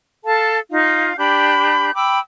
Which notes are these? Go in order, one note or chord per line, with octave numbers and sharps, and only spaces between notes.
A4 F5 A5
D#4 F4 F5
D4 G4 B5 G6
G5 B5 D6 E6